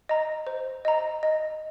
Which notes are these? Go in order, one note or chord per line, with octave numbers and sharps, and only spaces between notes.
D#5 A#5
C5
D#5 A#5
D#5